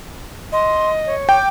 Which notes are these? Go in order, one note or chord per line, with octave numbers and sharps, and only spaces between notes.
D#5 C6
C#5
G5 D6